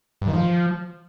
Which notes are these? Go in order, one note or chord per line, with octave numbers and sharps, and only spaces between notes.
G2
D#3
F3